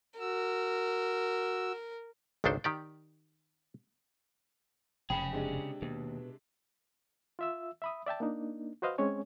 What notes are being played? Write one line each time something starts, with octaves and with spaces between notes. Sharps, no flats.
F#4 A#4 E6
G#1 C#2 D#3 D4 A4 C5
D#3 G4 D5
F1 F#2 C#3 C#4 G#4 G5 B5
C3 G#3 D4
D#2 B2
F4 E5 E6
E5 B5 D#6
D5 E5 G5 A5
A#3 D4 D#4
F#4 B4 C5 D#5 F5
G#3 C4 C#4 C#5 G#5